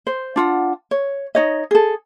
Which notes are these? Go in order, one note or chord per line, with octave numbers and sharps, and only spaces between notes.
C5
D4 F4 F#5
C#5
D#4 C#5 D#5
G#4 A4